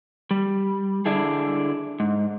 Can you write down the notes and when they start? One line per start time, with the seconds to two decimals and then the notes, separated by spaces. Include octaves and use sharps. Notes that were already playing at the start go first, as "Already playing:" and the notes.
0.31 G3
1.06 D3 D4 E4 G#4
2.00 G#2